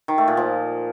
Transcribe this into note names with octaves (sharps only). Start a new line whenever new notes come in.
D#3
A3
A#2
F3